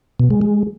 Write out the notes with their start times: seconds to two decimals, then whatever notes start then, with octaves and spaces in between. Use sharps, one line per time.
0.20 B2
0.30 G#3
0.41 G#3